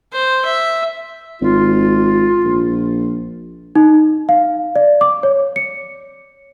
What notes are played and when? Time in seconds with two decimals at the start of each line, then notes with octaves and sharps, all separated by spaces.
0.12 C5
0.45 E5
1.42 G#1 F4
2.45 A#1
3.75 D#4
4.29 F5
4.76 D5
5.01 D6
5.23 C#5
5.56 C#7